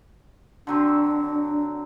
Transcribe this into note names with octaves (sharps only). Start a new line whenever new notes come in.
D3 F#3 C4 D4